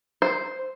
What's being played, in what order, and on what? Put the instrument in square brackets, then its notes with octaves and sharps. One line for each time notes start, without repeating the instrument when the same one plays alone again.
[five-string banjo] C5